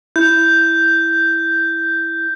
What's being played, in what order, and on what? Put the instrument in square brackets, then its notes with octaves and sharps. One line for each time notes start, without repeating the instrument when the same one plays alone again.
[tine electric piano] E4 [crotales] G6